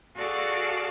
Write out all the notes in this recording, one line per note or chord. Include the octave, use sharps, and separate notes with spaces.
F#4 G#4 A4 D5 F5